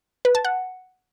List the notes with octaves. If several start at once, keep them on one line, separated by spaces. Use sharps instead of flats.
B4
A5
F#5